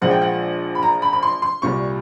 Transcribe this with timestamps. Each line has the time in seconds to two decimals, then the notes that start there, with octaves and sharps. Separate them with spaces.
0.01 A#1 A#2 F3 G#3 F#5
0.11 G5
0.22 F#5
0.75 B5
0.83 A#5
1.02 B5
1.13 B5
1.23 C6
1.42 C6
1.62 C2 A#2 G3 C#6